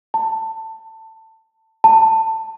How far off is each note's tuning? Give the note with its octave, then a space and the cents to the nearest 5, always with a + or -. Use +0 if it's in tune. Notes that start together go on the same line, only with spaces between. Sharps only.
A5 +20
A5 +20